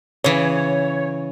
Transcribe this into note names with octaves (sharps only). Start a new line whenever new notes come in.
C#3 E3 C#5